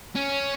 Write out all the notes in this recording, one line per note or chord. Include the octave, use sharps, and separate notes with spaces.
C#4